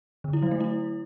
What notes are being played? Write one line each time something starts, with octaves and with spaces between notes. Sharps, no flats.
D3
E4
F#3
A3
E4